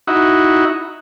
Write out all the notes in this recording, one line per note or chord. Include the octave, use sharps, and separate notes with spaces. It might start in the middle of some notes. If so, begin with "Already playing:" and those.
D#4 E4 F#4